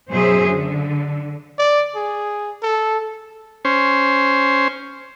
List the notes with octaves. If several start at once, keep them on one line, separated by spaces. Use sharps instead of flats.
F#2 B2 F#3 G#4 C5 E5
D3
D5
G#4
A4
C#4 C5